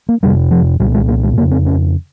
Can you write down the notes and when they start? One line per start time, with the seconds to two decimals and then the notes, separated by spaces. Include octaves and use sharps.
0.09 A#3
0.23 F2 C3 G3
0.51 F3
0.80 C2 A#2 G3
0.95 G#3
1.08 A#3
1.23 G#3
1.37 F2 A#3
1.40 C#3
1.51 C4
1.66 C#4